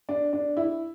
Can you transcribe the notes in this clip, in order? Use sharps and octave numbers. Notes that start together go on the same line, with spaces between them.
D4
D4
E4